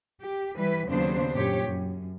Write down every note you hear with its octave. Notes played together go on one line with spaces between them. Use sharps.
G4
E3 G3 B4
D#2 C#3 F#3 B3 D4 C5
F#2 A#2 G4 C#5
F#2